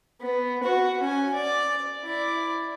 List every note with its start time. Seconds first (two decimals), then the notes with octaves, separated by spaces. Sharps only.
0.21 B3
0.63 F#4
1.02 C#4 G#5
1.34 D5
2.03 E4 D5